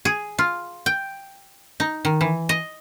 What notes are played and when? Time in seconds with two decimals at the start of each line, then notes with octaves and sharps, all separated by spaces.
0.05 G#4
0.38 F4
0.86 G5
1.80 D#4
2.05 D#3
2.21 E3
2.49 D#5